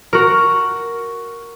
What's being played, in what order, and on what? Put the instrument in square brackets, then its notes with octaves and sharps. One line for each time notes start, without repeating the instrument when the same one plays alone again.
[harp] F#4 A#4